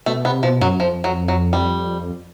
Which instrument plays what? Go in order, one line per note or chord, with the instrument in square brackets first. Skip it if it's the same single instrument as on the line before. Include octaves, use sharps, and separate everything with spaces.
[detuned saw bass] B2 [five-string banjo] A3
[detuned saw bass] C3 [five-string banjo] B3
[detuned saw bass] B2 [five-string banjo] F3
[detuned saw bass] F#2 [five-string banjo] F#3
[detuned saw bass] F2 [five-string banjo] F3
[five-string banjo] F#3
F#3
G3